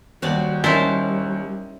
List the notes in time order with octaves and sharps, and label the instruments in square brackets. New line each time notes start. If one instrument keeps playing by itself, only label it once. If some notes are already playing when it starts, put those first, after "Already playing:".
[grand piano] D#2 [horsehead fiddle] G3 [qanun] C4 F#4 D5
[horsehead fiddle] G3 [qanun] C#4 D#4 A#4 [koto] E4 C5 A5